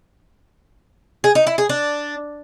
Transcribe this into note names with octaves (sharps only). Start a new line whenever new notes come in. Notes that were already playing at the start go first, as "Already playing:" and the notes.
G#4
D#4
E4
G#4
D4